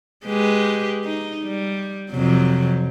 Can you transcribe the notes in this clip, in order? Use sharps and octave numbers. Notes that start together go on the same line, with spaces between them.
G#3 G4 B4
D#4
G3
F2 C3 F#3